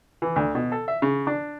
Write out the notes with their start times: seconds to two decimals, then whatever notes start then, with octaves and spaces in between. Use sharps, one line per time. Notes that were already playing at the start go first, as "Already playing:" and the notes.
0.22 E3
0.36 D2
0.55 B2
0.72 A4
0.88 E5
1.02 C#3
1.27 D4